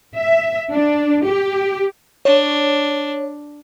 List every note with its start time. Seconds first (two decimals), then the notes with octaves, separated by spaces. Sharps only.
0.16 E5
0.71 D4
1.25 G4
2.25 D4 C#5